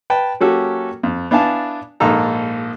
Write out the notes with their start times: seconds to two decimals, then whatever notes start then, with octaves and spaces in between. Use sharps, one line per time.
0.10 B4 G5 A5
0.40 F#3 A#3 C#4 F#4 G4 A4
1.03 F2
1.31 B3 D4 E4 F5 G#5 A5
2.00 A#1 G#2 A#3 D#4 A4 A#5